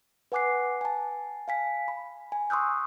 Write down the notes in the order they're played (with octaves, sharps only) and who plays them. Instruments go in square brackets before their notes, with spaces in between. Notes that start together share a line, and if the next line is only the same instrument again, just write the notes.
[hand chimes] B4 F#5 G#5 D6 F#6 C7
G#5 A5
F5 G#5 B6
B5
G#5
C6 C#6 D#6 E6 F#6 G6